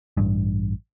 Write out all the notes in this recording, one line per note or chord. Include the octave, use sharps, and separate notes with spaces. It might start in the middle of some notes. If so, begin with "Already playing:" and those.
A1 G2